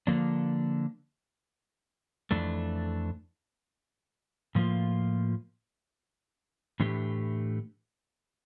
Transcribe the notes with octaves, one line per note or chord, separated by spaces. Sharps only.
D3 F3 A#3 D4
F2 E3 A3 D4
A2 F3 A#3 F4
A2 E3 A3 D4 G4